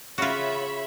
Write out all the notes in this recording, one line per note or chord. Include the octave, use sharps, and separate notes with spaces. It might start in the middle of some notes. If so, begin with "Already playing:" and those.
C#3 F4 F#4 C#5 E5 B5